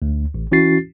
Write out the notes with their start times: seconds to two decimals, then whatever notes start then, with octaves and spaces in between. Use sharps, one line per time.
0.02 D2
0.34 A1
0.52 E3 C#4 E4 F#4 A6 C7